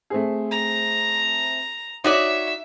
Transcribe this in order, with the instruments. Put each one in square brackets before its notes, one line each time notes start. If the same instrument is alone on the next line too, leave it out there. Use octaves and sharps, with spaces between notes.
[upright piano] A3 C4 G#4
[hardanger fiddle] A#5
[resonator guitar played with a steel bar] D#4 F#4 D5 [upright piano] C#5 [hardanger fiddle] E5